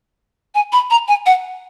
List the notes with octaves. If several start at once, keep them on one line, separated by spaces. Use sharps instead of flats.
G#5
B5
A#5
G#5
F#5